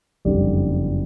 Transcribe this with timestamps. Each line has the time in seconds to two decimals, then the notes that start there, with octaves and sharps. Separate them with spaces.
0.25 F#1 F2 D3 G3